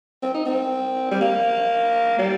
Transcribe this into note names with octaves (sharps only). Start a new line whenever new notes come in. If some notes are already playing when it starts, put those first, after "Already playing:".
C4
D#4
C4
G3
A#3
G3